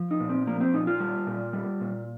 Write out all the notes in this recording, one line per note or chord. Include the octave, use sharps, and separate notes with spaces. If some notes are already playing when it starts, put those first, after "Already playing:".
Already playing: F3
D#4
A#2
C4
F3 A#3
C4
A#2 D#4
F4
G3
A#2
G3
A#2